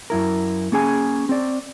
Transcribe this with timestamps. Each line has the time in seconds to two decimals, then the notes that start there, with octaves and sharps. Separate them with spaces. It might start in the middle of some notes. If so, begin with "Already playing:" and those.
0.10 F#2 E4 A#4
0.72 A#3 C#4 G#4 G#5
1.29 C4 D5